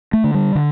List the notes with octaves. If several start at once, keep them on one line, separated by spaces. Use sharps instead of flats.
A3
D3
G3
D3